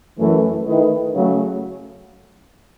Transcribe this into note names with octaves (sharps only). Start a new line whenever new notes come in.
F#2 E3 A3
D#3 A3 E4 B4 D#5
C#3 F#3 A3